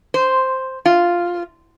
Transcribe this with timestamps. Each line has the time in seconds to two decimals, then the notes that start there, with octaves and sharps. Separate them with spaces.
0.14 C5
0.86 F4